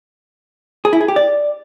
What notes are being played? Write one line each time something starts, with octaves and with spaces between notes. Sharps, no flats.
G#4
E4
G#4
G4
D5